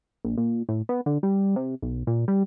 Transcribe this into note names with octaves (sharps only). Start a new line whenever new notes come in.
A#1
A#2
A2
B3
D3
G3
C3
B1
A#2
G3